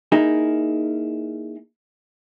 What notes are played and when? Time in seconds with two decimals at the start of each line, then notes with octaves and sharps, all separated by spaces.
0.12 A#3 D#4 E4 G#4